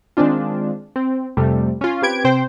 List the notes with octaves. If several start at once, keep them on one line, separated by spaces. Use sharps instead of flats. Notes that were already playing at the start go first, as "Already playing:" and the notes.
D#3 G#3 C4 D4 F4
C4
F2 C3 G3 A3
C#4 F4
C4 G4 B4 G#6 D7
C3 C4 C5 G5